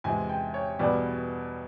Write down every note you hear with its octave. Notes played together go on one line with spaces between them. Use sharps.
E2 C3 F3 G#3 G#5
G5
C#5
E2 B2 G3 B3 D5